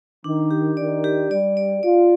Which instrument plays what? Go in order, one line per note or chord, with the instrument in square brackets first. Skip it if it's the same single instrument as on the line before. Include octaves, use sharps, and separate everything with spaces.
[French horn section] D#3 [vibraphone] D4
[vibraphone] G4
[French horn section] D#3 [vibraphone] D5
[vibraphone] G4
[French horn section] G3 [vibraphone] D5
[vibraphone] D5
[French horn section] F4 [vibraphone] D5